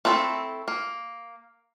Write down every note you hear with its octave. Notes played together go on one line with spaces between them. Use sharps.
A3 C4 D4 E4 A4
A#3